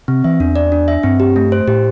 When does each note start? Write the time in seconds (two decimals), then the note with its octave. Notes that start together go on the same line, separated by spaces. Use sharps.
0.08 C3 C4
0.24 E3 E5
0.40 E2 D4
0.56 D5
0.72 D4
0.88 E5
1.03 G2 C4
1.20 G4
1.36 A3
1.52 C5
1.67 A2 G4